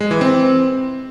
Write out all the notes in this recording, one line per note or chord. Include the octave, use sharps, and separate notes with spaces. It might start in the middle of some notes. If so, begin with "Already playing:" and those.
G#3
E3
C4